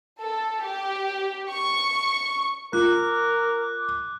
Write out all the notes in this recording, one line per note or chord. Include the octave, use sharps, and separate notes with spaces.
A4
G4
C#6
F4 A#4 D6 F#6